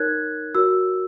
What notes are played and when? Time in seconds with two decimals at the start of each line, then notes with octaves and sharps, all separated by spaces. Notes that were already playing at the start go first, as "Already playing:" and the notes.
Already playing: D#4 A#4 C#5 F#6 G#6
0.55 F#4 A#4 C#5 E6